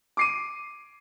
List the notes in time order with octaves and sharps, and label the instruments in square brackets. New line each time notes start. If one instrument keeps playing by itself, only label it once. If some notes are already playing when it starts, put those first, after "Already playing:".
[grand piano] D6 C7 D#7